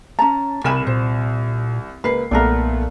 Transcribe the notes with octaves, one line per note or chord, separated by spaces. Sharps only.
C#4 A5 A#5
C2 C3 A#4 G#5 B5 E7
A#2 C5
C#2 A#3 B4 C7
B1 A#2 A3 B3 A#4 D5